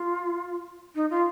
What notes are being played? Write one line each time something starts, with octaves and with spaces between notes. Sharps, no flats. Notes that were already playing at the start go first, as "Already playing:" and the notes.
Already playing: F4
D#4
F4